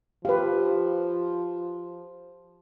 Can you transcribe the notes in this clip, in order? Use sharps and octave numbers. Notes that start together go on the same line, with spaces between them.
F3 G4 B4 F5